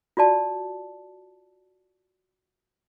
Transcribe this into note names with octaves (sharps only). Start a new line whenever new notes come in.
F4 F#4 D5 A5